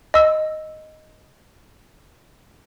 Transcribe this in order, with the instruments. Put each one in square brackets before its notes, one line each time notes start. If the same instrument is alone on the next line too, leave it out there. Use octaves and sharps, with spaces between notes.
[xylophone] D#5 E6